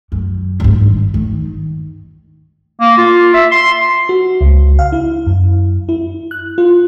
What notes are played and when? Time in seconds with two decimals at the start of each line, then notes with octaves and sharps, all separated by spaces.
0.12 F#2
0.60 G#1 G2
1.14 D#3
2.81 A#3
2.98 F4
3.34 E5
3.51 C6
4.09 F#4
4.41 C#2
4.79 F5
4.92 E4
5.26 F#2
5.89 E4
6.31 F#6
6.58 F4